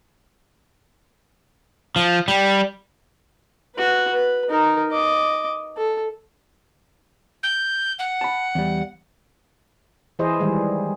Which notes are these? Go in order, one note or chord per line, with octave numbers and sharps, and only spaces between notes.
F3
G3
F#4 B4
B4
D#4 A#4
D#5 D6
A4
G6
F#5
A5 B5
E2 G3
E3 E4 G#4 C5 D#5
D#3 E3 G3 G#3